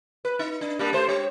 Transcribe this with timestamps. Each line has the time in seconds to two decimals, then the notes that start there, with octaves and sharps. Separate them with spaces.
0.25 B4
0.39 D#4
0.61 D4
0.79 G3 A#3 D4
0.93 A3 C5
1.08 G#3 G4 C#5